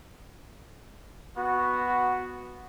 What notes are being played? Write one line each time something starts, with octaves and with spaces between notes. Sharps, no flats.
B3 F#4